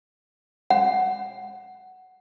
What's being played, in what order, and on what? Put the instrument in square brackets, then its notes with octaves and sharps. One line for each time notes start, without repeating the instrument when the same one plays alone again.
[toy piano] F#5